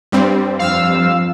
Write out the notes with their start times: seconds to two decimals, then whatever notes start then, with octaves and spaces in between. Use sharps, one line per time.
0.12 G2 G3 C4
0.59 F2 F5 E6